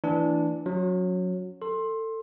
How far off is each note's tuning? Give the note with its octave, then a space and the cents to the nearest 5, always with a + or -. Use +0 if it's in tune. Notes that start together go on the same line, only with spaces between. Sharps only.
E3 +0 A3 +45 D4 +0
F#3 -20 C#4 +10
A4 +20 C6 +20